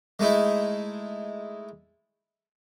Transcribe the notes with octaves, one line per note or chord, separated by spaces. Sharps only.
G#3 A3 D#4 E4